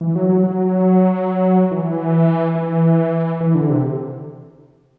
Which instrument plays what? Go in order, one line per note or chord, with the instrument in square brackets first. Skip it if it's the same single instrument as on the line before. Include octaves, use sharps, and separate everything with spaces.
[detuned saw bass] E3
F#3
F#3
F#3
E3
E3
E3
D3
C3